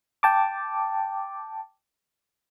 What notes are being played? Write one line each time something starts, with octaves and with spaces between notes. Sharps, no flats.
G5 A5 D6